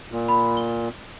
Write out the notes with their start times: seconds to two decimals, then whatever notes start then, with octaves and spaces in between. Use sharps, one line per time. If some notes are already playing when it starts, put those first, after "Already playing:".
0.11 A#2
0.29 B5
0.57 G7